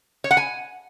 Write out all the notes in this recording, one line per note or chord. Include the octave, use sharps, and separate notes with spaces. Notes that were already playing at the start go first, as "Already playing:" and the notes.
C#5
F#5
G#5